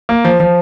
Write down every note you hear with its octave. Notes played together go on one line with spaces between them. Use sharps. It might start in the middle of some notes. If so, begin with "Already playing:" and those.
A#3
F3
F3